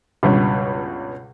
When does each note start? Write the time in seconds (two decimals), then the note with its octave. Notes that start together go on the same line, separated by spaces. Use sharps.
0.23 C#2 G2 B2